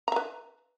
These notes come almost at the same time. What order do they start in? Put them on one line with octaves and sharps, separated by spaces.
A#5 E5 B4